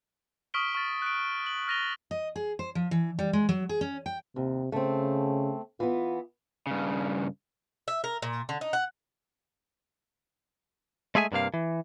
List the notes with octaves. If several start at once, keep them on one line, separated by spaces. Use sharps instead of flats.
C#6 D#6 F6 B6 D7 G7
C#6 F6 A6
F#6 D7
F#7
F6 A6 A#6 D#7 F7 G7
D#5
G#4
C5
F3
E3
G3
G#3
F#3
G#4
C#4
G5
D#2 C3
C#3 A3 C4
E3 B3 F4
G2 C#3
E5
A#4
A#2
D3
D#4
F#5
G#3 A3 G#4 E5 G#5
G2 C3 A#3 F5
E3